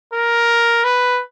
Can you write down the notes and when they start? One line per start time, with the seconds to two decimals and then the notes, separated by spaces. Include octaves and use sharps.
0.13 A#4
0.84 B4